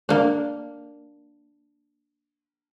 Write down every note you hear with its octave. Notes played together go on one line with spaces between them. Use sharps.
A#3 D4